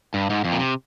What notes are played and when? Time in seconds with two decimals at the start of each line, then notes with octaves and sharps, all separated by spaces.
0.14 G2
0.30 G#2
0.44 F2
0.52 A#2
0.59 C3